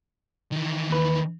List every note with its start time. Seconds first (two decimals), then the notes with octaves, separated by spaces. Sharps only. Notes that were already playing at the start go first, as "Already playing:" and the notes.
0.52 D#3 E3
0.90 D#2 B4